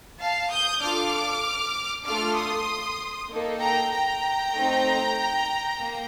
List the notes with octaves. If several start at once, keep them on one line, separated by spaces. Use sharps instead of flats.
F5 A5
D#6 G6
D4 F4 A4 D6 F6
A3 D4 F4 A4 D6 F6
C6 D#6
A#3 D#4 A4
G5 A#5
G5 A#5
A3 C4 D#4
A#3